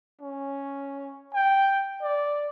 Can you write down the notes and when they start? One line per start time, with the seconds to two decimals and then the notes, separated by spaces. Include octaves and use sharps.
0.21 C#4
1.34 G5
2.02 D5